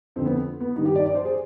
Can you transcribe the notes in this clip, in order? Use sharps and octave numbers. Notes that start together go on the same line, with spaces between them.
F2 D3 C4
B3
B3
G2 D#3 D#4
G4
D5
D5
C5
G#4